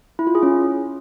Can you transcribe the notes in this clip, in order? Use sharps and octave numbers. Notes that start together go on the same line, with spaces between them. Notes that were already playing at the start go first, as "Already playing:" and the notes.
E4
F4
G#4
C#4